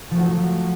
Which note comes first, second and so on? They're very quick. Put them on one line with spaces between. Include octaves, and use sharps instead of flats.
F3 A3 F#4 F#3